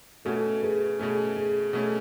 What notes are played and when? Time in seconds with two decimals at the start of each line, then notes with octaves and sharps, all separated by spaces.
0.25 B2 A3 C#4 F#4 A4
0.62 G#4 B4
0.99 B2 A3 C#4 G#4
1.36 G#4
1.73 B2 A3 C#4